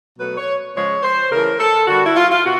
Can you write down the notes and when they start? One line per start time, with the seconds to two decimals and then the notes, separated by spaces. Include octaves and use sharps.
0.18 B2 F#3 A3 B4
0.37 C#5
0.75 C#3 F3 G#3 C#5
1.03 C5
1.31 C#3 E3 A3 A#4
1.60 A4
1.87 D3 G3 F#4
2.02 E4
2.16 F4
2.30 F4
2.44 B2 F#4